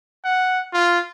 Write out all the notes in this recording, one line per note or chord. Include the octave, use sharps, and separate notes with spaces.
F#5
F4